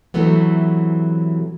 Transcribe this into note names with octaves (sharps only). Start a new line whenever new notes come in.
C3 E3 F#3 A3 B3